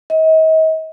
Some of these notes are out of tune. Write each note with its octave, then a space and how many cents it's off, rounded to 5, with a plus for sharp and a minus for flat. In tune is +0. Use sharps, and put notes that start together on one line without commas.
D#5 +40